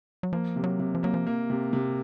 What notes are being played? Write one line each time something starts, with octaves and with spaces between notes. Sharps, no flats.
F#3
F3 A#3
C3
F#3
C3
F3
F#3 A#3
F3
A#3
C3
C3